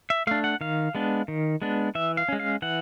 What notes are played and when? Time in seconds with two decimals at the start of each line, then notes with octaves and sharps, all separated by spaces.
0.10 E5
0.27 A3 D4 F5
0.44 F#5
0.61 D#3 F5
0.95 G#3 B3 D4
1.28 D#3
1.62 G#3 B3 D4
1.95 E3 E5
2.17 F5
2.29 G#3 C#4
2.40 F5
2.62 E3 F#5